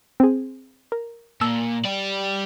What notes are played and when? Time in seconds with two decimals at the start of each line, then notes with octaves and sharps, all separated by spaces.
0.20 C4 G#4
0.92 A#4
1.41 A#2 A5 E6
1.85 G4 D5